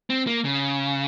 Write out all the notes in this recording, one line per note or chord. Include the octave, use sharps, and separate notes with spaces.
C4
A#3
C#3